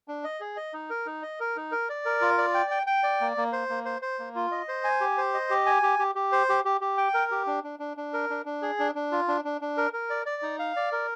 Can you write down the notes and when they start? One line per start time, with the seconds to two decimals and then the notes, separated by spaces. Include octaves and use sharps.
0.08 D4
0.24 D#5
0.40 G#4
0.57 D#5
0.73 D#4
0.90 A#4
1.06 D#4
1.23 D#5
1.40 A#4
1.56 D#4
1.72 A#4
1.89 D5
2.05 A#4
2.21 F4
2.38 D5
2.54 G5
2.71 G5
2.87 G5
3.03 D5
3.21 A#3
3.37 A#3
3.53 C5
3.69 A#3
3.85 C5
4.02 C5
4.19 A#3
4.35 F4
4.52 D#5
4.68 C5
4.84 G#5
5.01 G4
5.17 C5
5.34 D#5
5.50 G4
5.66 G#5
5.83 G4
5.99 G4
6.15 G4
6.32 C5
6.49 G4
6.65 G4
6.81 G4
6.98 G5
7.14 A#4
7.31 G4
7.47 D4
7.64 D4
7.79 D4
7.97 D4
8.13 A#4
8.30 D4
8.45 D4
8.62 G#4
8.79 D4
8.95 D4
9.12 F4
9.28 D4
9.45 D4
9.61 D4
9.77 A#4
9.93 A#4
10.10 D5
10.26 D5
10.42 D#4
10.59 F5
10.76 D5
10.92 A#4